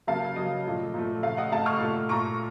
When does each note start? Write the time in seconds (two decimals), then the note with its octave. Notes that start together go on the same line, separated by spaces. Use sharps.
0.07 C#3 F#3 A#3 F5 A5
0.36 C#3 F#3 A#3 D#5
0.66 A#2 F3 A3
0.94 A#2 F3 A3
1.23 C#3 A3 F5
1.37 D#5 F#5
1.51 C#3 A3 F5 A5
1.66 C#6 F6
1.80 A#2 A3
2.09 A#2 A3 A#5 C#6